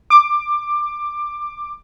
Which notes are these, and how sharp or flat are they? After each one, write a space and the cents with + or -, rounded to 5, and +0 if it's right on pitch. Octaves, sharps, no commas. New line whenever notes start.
D6 +15